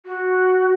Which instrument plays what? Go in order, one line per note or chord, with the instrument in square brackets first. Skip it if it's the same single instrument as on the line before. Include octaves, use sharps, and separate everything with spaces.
[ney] F#4